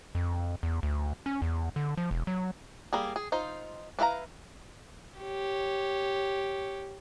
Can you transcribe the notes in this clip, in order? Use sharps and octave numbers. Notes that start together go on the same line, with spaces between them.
F2
E2
D2
C#4
E2
D3
F3
E1
F#3
G3 A#3 G#4
G#4
D#4 F4 C5
D4 E4 B4 F5 A#5
G4 C#5